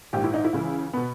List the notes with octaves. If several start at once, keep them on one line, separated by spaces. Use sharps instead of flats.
A#1 G#2 D#3 G4
E4
D#4
E4
C#2 C#3 E3
B2 B3